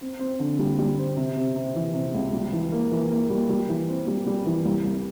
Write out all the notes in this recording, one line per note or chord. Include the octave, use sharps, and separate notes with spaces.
C4
C4
D3
G3
G3
C4
C3
C3
C3
E3
C3
C#2
G3
E3
A#3
E3
A#3
G3
G3
E3
C4
G3
G3
E3
C2
C2